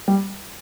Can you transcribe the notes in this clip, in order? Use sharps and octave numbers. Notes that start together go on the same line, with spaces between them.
G3